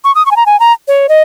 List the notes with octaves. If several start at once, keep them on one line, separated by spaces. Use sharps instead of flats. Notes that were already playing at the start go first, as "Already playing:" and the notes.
C#6
D#6
C#6
G#5
A#5
G#5
A#5
C#5
D#5